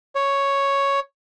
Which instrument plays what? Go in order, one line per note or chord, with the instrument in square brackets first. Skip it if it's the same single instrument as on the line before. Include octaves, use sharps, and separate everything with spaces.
[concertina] C#5